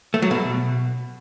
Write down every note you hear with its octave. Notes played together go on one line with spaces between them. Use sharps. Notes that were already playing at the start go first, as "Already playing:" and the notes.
A3
F#3
B2